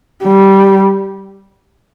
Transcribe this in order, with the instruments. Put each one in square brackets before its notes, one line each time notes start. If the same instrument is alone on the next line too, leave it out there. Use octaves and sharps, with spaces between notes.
[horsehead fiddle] G3